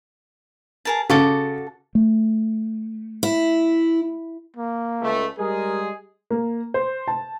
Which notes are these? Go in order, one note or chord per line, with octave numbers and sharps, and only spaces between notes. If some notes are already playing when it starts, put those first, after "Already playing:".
G#4 A#4 A5
C#3 F#4 A4 D6
A3
E4
A#3
C#2 A3
G3 G#3 G#4 A#4
A#3
C5
A5